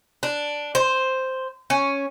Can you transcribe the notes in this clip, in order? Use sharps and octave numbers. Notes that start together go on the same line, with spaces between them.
D4
C5
C#4